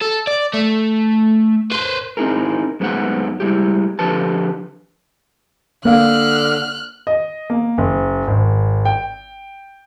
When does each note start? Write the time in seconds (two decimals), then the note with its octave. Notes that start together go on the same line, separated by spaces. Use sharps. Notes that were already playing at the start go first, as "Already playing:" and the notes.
0.02 A4
0.27 D5
0.53 A3
1.72 B4 C5
2.17 C4 D#4 E4 G#4 A#4
2.80 F#2 G#3 B3 C4 D#4 F#5
3.40 G3 G#3 E4 G4
3.99 D3 F3 G4 A4 B4 A5
5.85 D3 A#3 F5 F6 F#6
7.07 D#5
7.50 A#3
7.78 F#1
8.27 G#1
8.85 G5